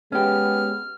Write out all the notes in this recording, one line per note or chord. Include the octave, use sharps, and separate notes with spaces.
G#3 B3 C#4 G4 F6